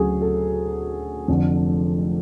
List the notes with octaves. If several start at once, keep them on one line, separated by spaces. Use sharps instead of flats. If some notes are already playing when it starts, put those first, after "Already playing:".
Already playing: D2 C#3 F#3 A3 F#4 G#4
A4
F1 F2 D3